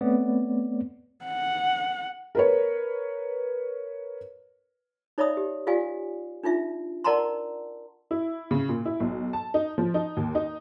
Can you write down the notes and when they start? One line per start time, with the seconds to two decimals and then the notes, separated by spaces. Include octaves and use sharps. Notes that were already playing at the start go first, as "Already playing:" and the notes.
0.01 A3 B3 C4 C#5 D5
1.25 F#5
2.35 A#4 B4 C#5
5.18 D#4 C#5 D5 E5 B5 D#6
5.37 G4
5.67 F4 G4 D5 F5 G#5
6.43 D4 D#4 F4 E5
7.04 A#4 D5 F#5 A5 A#5 C6
8.11 E4
8.51 C#3
8.69 A#2
8.85 E4
9.00 B1
9.33 A5
9.54 D#4
9.78 F3
9.94 D#4
10.17 D#2
10.35 D#4